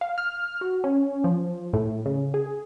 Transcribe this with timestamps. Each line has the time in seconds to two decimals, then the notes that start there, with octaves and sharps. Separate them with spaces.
0.01 F5
0.18 F6
0.61 F#4
0.84 C#4
1.24 F3
1.73 A2
2.06 C#3
2.34 G#4